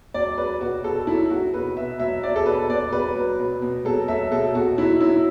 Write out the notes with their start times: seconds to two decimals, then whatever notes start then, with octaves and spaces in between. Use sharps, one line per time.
0.14 F#3 D5
0.38 F#3 B4
0.61 B2 F#4
0.84 B2 A4
1.07 F#3 E4
1.30 F#3 F#4
1.54 B2 B4
1.76 B2 E5
2.00 F#3 E5
2.23 F#3 D5
2.36 A4
2.46 B2 B4
2.69 B2 D5
2.92 F#3 B4
3.16 F#3
3.39 B2
3.62 B2
3.85 F#3 A4
4.08 F#3 E5
4.31 B2 A4
4.55 B2 F#4
4.78 F#3 E4
5.00 F#3 E4